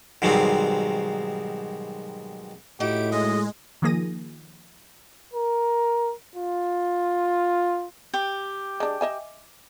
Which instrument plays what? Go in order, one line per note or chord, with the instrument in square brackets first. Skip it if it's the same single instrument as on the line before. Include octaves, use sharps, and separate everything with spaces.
[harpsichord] G#2 B2 D#3 F#3 G3 C4
[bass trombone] A2 [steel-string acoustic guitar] D#4 E4 F#4 [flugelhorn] G4 [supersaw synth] D7
[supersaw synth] G#3 [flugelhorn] D#5
[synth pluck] D#3 F3 A#3 G#4 A#6 D#7
[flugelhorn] A#4
F4
[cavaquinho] G4
[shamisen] G#3 D4
D#5 E5 G#5